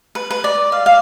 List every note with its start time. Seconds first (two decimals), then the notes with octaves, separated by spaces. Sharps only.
0.15 B4
0.30 B4
0.44 D5
0.72 F5
0.86 F5